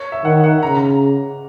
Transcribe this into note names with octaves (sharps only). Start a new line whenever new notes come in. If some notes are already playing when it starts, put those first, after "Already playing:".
Already playing: C#5
E5
D#3 F#5
F#5
C#3 A#5
A#5